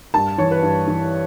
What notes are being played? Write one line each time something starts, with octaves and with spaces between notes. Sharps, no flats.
G2 A5
E3 C#5
B4
G2
E3